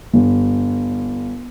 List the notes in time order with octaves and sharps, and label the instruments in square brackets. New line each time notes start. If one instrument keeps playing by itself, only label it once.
[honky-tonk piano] G1